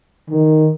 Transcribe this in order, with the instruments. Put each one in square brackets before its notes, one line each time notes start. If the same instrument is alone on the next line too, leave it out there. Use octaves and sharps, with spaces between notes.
[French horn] D#3